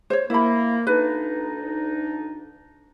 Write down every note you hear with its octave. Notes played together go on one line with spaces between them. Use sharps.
C5 C#5
A#3 E4 B5
D2 D4 D#4 B4